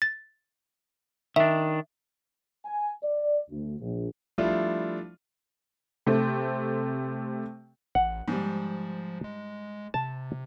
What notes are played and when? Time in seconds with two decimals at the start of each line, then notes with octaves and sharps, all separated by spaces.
0.02 A6
1.36 D#3 D4 E5
2.65 G#5
3.04 D5
3.50 D2
3.81 A#1
4.38 F3 G3 A3 D4 E4 F4
6.06 C3 A3 C4
7.95 A1 F#5
8.28 G#2 F3 G3
9.24 G#3
9.94 C3 A5